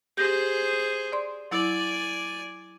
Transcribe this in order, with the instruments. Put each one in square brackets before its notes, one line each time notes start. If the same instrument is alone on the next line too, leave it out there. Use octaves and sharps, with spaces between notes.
[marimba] G4 G6 A#6 [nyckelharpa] G#4 C5
[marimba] D5 C6
[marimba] F#3 E4 [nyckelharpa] D5 G#5